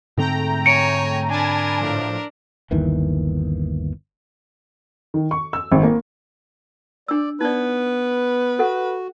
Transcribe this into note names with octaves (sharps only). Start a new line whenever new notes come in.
G#2 D3 A3 C4 G5 A#5
C#5 G#5 C#7 D7
D4 A#4 G#5 A5 B5
A2 F3
G1 D#2 D#3 E3
D#3
C#6
E6
G#1
A#3
D4 D5 E6
B3 D#4 B4 D5
F#4 A4 F#5